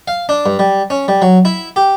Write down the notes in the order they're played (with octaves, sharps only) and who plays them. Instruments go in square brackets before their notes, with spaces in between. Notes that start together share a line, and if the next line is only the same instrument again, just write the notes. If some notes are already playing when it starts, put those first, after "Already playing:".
[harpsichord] F5
D4
G2
G3
C#4
G3
F#3
E4
G4